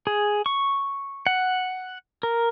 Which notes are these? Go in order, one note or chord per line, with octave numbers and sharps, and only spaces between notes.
G#4
C#6
F#5
A#4